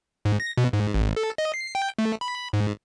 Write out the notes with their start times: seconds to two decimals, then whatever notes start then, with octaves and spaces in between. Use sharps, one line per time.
0.25 G#2
0.40 A#6
0.57 B2
0.73 G#2
0.94 G#1
1.16 A4
1.38 D#5
1.54 C7
1.75 G5
1.99 A3
2.21 B5
2.53 G#2